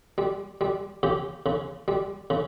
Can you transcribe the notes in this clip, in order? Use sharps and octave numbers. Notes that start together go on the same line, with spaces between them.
G3
G3
C#3 G4
C#3
G3
C#3